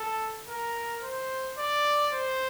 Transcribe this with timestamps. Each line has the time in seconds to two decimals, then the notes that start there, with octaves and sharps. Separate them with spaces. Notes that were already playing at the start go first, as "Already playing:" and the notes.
Already playing: A4
0.47 A#4
1.02 C5
1.58 D5
2.13 C5